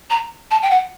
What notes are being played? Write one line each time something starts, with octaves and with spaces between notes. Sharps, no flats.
A#5
A5
G5
F#5